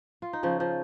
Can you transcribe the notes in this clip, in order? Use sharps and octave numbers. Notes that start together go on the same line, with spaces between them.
F4
D#4
C#3 F3 C#4
F3